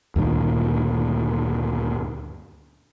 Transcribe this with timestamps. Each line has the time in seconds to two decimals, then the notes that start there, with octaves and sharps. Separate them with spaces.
0.16 D2 G2 A#2 D#3